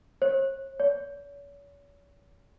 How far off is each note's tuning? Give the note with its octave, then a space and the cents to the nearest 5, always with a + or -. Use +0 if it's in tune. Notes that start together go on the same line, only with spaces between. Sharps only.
C#5 -45
C#5 +40